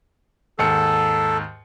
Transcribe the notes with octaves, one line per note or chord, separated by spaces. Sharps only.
D#2 G#2 A4 C#7